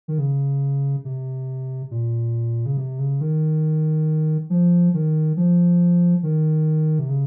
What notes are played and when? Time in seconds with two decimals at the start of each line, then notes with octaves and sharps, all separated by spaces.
0.08 D#3
0.18 C#3
1.05 C3
1.91 A#2
2.66 C#3
2.77 C3
2.99 C#3
3.21 D#3
4.50 F3
4.94 D#3
5.37 F3
6.23 D#3
6.99 C3
7.09 C#3